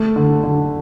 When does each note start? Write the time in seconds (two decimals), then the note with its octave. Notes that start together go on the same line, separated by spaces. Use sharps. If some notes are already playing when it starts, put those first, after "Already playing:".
Already playing: A3
0.16 D3
0.44 D3